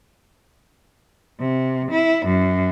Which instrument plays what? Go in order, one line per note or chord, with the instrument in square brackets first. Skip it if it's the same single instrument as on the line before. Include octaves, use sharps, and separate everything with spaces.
[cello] C3
E4
F#2